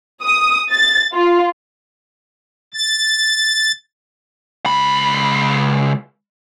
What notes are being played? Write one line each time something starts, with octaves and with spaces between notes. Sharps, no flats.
D#6
A6
F4
A6
C#2 B5